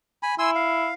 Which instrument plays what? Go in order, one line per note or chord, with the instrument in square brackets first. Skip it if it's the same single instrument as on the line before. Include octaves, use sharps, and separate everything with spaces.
[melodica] G#5 B5
[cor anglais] E4 [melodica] G#5 C6 E6
[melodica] F5